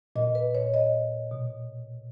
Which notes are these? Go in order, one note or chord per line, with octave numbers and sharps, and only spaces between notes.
A#2 D#5
B4
C#5
D#5
B2